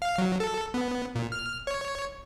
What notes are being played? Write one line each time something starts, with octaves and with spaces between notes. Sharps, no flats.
F5
F#3
A4
B3
A#2
F6
C#5